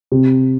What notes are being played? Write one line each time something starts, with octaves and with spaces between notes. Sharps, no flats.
C3